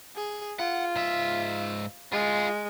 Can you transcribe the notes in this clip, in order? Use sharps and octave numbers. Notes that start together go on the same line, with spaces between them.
G#4
F4 F#5
G#2 E5
G#3 F4 G#4